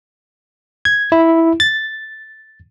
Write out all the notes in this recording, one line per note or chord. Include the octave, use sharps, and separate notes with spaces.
G#6
E4
A6